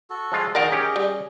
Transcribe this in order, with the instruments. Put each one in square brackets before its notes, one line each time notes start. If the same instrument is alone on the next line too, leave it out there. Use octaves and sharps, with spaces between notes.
[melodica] F#4 A4
[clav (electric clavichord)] F3 G#3 F4
[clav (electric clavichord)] D#3 A#4 [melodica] G#4 D#5 [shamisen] D5 F5 F#5
[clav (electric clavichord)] C#4 G4
[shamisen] G3